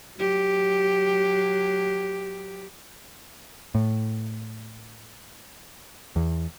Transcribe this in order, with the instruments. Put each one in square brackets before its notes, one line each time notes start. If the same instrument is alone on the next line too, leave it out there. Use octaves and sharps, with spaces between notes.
[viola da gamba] F#3 G4
[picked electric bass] A2
E2